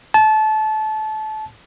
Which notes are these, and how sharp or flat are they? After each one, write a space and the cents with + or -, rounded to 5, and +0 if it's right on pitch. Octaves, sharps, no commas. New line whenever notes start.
A5 -25